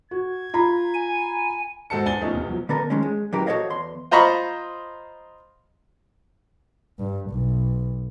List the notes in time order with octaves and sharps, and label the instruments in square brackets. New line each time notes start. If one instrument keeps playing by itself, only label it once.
[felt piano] F#4 [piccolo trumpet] G#6
[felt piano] F4 A#5 B5
[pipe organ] G#5
[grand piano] G#2 F#4 A4 C5 A5 C#7
E2 D4 G#5 A6 G7
F3 A3 C#4 D#4 F4
F1 E2
F3 F#3
[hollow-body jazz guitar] D3 B3 A4 A#4
D#3 F3 G#3 C#4
G#3
F#2 E3 G4 A#4
F#4 A4 C5 C#5 D#5 F5
E2 C6
[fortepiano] F4 C5 D#5 A#5 B5 C#6
[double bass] G2
B1